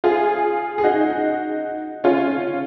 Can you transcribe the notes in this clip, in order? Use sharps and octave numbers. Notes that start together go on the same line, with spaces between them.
F4 G#4
G#4
D#4 F#4
C#4 F4